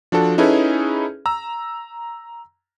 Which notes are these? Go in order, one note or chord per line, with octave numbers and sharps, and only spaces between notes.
F3 D4 F#4 A4
C#4 D#4 E4 G#4 A4 B4
A#5 E6